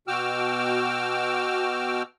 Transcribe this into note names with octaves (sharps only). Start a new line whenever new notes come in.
B2 F#4 G5 D6 E6 F6